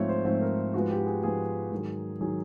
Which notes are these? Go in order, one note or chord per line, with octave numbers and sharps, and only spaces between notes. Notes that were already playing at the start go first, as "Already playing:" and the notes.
Already playing: G#2 F3 A3 C4 C#5
C5
G#2 F3 A3 C4
A#4
G#2 F3 G#3 B3 F#4
G4
G#4
G#2 F3 G#3 B3 G#4
G#2 D#3 F#3
D#3 F#3 G#4